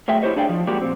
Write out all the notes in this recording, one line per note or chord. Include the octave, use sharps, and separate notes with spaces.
F#3 A3 G#4 E5 G5
E4 G4 G#4 C5 C#5 D#5
D4 G#4 D5 F5 G5
F3
G#3 A#3 F#4 G4 D5
A#2 C4